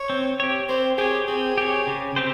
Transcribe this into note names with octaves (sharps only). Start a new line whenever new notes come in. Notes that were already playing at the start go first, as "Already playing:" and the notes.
Already playing: C#5
C4
G4 C#5
C4 C5
G4 G#4 C#5
C4 G#4
G4 C#5
C#3
C4 G4 C5